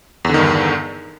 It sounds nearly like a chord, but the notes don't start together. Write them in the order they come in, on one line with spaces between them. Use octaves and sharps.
E2 D3 D#3 G2